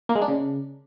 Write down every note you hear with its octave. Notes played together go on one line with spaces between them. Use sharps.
A#3
G#3
D4
C#3